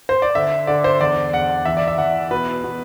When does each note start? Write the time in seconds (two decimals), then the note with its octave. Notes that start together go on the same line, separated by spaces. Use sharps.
0.09 C5
0.22 D5
0.35 D3 E5
0.67 D3 D5
0.84 C5
1.00 E2 D5
1.33 E2 F#5
1.65 E3 E5
1.77 D5
1.87 E5
1.98 E3 F#5
2.31 B2 B4
2.64 B2